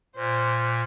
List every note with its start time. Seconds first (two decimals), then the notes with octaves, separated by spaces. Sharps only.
0.16 A#2 C5